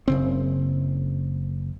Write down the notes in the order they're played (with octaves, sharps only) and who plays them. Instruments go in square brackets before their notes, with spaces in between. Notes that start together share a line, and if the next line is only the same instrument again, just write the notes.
[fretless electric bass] F#1 C#3 C4